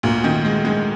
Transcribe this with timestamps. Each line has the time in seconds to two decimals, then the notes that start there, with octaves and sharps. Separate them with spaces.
0.03 D2 A#2
0.24 D#3
0.45 G#3
0.65 G#3